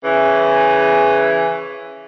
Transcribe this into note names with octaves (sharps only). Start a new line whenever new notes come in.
C#3 E3